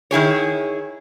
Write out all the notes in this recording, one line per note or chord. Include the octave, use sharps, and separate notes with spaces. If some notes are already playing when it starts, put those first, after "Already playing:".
D#3 E4 G#4 C#5